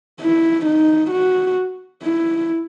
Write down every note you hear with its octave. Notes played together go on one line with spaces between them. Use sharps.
E4
D#4
F#4
E4